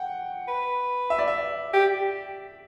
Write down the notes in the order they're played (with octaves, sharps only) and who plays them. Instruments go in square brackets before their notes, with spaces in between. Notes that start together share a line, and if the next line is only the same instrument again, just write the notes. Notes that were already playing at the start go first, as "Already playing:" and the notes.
Already playing: [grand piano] F#5 G5
[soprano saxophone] B4
[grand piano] E5
D5
E5
[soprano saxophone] G4